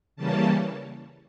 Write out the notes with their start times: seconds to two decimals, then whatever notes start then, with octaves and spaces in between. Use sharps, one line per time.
0.16 C#3 E3 G3 A#3 C#4 A5